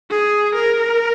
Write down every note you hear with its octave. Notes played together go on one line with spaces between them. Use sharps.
G#4
A#4